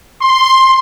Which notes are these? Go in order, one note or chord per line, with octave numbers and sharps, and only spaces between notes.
C6